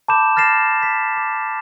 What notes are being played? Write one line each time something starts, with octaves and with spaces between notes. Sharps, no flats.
A5 B5 D6 G6 E7
F6 A6 A#6 C7 E7
B6
D6